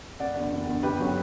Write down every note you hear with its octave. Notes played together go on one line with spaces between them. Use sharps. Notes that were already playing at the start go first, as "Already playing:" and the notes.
F#1 D5 F#5
E2 D3
F#1
E2 D3
G1 G4 B4
F#3 C#4